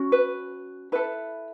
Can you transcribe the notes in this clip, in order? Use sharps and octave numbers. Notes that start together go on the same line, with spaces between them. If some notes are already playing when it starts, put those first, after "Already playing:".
Already playing: C#4 F#4
B4
E4 A4 B4